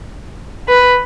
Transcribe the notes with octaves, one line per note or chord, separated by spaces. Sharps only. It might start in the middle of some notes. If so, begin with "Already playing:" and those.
B4